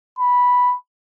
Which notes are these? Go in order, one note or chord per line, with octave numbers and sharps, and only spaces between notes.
B5